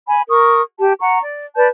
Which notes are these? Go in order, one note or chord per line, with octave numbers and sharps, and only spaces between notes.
G#5 B5
A#4 C#6 D#6
G4 A5
F#5 A#5 C#6
D5
B4 D5 A5 G6